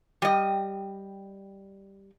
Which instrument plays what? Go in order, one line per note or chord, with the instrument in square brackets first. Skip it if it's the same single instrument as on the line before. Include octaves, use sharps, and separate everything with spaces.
[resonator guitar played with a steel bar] G3 D#5 [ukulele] G4 G5